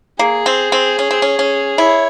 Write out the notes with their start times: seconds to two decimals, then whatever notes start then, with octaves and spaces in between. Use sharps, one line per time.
0.19 A#3 G#4
0.46 C4
0.72 C4
0.99 C#4
1.11 C4
1.22 C#4
1.39 C#4
1.78 E4 C#5